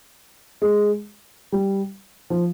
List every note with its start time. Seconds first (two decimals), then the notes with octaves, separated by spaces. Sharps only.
0.62 G#3
1.52 G3
2.30 F3